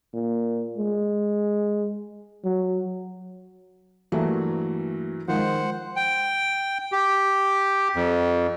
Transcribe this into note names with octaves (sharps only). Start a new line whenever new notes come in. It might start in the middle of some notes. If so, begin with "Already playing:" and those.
A#2
G#3
F#3
G2 E3 F#3 A3 A#3
D#3 F3 G#3 C5 F#5
G5
G4
F2